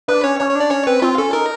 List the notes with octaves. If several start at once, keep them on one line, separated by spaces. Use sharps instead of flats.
D4 B4
C#4 C#5
C#4 C#5
C#5
D4
D5
C#4 C#5
C4 B4
C4 F4
C#4 A4
D#4 A#4